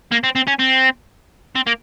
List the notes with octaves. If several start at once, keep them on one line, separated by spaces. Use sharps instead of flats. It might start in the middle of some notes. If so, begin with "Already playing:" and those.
A#3
C4
C4
C#4
C4
C4
A#3